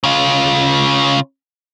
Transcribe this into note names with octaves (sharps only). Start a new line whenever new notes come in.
C#3 F4